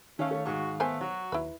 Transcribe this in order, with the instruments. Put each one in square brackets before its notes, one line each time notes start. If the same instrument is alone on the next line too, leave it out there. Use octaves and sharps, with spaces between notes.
[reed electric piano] D#3 F5 [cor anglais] A3 [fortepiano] C#4
[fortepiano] A3 [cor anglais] C#5
[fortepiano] G#2 C#6 [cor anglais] F#4
[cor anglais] A3 [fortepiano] B3 [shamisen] A#4 C5 G#5
[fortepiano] F#3 [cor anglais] F#4
[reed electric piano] D#2 [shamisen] E4 B4